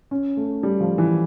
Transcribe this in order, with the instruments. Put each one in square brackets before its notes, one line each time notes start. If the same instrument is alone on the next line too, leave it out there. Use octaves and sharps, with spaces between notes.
[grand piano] C#4
A3
G3
F3
E3